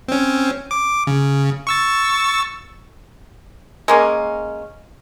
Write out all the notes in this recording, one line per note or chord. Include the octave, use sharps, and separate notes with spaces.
C4 C#4
D6
C#3
C#6 E6 A6
G#3 A#3 C#4